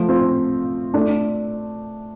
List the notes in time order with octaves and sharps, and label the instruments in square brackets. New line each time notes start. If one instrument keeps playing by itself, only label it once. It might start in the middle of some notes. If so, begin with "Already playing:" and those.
Already playing: [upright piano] F3 A3
C4 F4
A3 D4